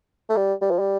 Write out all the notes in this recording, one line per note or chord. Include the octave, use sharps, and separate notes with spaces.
A3
G3
G3
F3
G3